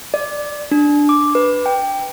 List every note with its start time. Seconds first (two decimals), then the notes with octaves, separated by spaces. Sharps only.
0.14 D5
0.71 D4
1.09 D6
1.35 B4
1.66 G5